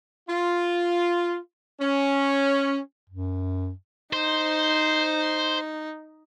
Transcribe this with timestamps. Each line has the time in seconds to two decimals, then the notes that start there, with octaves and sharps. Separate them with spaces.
0.29 F4
1.81 C#4
3.09 F#2
4.13 D#4 C5